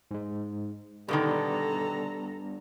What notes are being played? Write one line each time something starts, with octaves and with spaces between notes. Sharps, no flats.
G#2 G#3
B2 D3 D#3 G3 B3 D4 A4 A#5